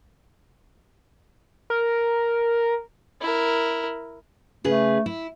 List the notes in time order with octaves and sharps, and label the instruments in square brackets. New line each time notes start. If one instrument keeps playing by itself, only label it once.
[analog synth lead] A#4
[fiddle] E4 A#4
[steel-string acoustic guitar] C#3 G#4 B4 [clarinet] A3
[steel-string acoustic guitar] E4